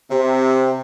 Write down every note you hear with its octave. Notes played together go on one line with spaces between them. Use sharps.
C3